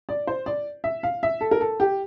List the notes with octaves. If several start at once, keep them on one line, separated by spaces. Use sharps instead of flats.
D5
C5
D5
E5
F5
E5
A4
A#4
A4
G4